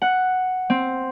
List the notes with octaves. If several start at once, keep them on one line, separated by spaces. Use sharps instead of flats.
F#5
C4